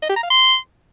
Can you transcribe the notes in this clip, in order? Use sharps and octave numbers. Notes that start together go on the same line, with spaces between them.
D#5
G4
A#5
F5
C6